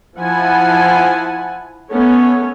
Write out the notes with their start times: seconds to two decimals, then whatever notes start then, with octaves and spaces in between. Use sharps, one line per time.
0.18 F3 E4 F#5 G#5 A5 B5
1.91 A3 B3 C#4 C#5